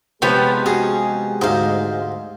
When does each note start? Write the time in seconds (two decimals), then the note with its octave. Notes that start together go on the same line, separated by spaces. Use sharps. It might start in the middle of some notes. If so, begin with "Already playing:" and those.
0.22 C3 F3 G#3 B3 G4 C#5 G5 B5
0.66 C#4 F#4 G#4
1.41 D2 G#2 D#4 C5 F5